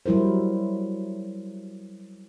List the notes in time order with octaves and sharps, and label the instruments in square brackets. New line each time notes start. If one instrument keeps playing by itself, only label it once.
[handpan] F#3 G3 E4 A#4 C5